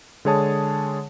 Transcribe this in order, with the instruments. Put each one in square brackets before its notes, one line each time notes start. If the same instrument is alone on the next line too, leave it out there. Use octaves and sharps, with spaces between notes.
[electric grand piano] D3 G#3 G#4 C#5 A5 D#6